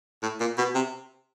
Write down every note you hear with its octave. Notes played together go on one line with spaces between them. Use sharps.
A2
A#2
B2
C3